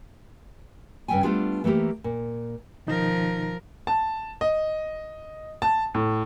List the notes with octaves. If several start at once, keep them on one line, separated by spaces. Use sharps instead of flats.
G2 C#3 C4 E5 G5 G#5
G3 A3 B3 D4 F4 G#4
E3 A3 A#3 G4 A#4
A#2
B2 D#3 F3 D#4 A#4
A5
D#5
A5
A2